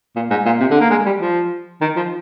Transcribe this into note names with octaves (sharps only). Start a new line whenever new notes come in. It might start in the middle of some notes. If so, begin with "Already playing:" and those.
A#2
G#2
A#2
C3
D3
A#3
G#3
G3
F3
D#3
F3